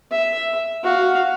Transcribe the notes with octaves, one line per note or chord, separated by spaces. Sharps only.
E5
F#4 F5